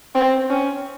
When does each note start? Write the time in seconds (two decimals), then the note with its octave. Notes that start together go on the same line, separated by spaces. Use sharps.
0.15 C4
0.50 C#4